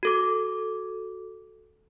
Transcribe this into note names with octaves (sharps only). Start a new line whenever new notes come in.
F#4 A4 D6